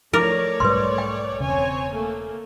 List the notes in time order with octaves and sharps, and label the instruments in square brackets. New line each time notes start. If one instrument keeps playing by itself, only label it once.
[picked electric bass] F3 [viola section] A3 C#5 D5 [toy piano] E4 D6 [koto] A#4
[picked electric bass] B1 G#2 G3 [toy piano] B4 C6
[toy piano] G5
[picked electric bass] E1 C#3 [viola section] C4 C#5 G#5
[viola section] A3 A#3